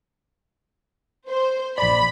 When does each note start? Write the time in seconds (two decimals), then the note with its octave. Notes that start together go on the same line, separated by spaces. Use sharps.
1.28 C5
1.78 A#1 D5 B5